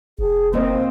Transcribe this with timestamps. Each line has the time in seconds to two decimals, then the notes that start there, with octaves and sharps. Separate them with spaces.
0.19 F1 G#4
0.54 A#3 C4 C5 D#5